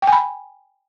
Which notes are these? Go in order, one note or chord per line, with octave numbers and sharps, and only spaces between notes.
G5
G#5
B5